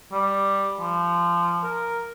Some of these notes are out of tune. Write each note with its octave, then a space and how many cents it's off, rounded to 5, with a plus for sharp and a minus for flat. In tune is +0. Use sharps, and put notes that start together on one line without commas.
G3 +5
F3 -20
A#4 +0